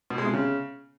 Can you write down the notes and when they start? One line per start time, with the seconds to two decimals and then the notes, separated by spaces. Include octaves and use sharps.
0.10 B2
0.18 G#3
0.26 C3
0.33 C#3